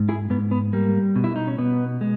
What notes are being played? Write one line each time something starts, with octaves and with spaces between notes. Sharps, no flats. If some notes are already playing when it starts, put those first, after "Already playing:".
Already playing: G#2
E4 G#4
G#2 B3
B3
G3 A#3
B2
E4
D#4
C#4
B2 B3
G#3